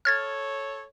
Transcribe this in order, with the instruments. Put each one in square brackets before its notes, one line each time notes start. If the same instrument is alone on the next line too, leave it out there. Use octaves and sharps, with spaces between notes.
[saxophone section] A4 C#5 [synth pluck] F6 G#6 A6